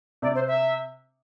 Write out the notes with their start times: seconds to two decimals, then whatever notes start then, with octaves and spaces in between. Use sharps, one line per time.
0.22 C3 D5
0.35 C5
0.47 E5